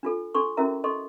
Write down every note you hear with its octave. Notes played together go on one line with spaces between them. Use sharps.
D4 F4 A4
D4 A4 C6 C#6
C#4 E4 F#4 A#4 E5 A#5
A4 D#5 C6 C#6